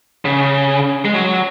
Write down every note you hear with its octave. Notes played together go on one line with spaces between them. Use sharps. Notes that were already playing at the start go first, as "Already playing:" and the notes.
C#3
G#3
F#3